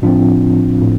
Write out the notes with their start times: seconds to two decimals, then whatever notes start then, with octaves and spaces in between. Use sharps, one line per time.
0.02 A2 F3 C4 D4 F4
0.81 A2